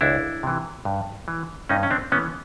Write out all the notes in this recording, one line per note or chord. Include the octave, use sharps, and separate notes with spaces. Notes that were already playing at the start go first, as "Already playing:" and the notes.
C#2 D4 E4
C3 E3
G2
E3
G2 C#4 D#4
C#4
C4 D4
E3 B3 C#4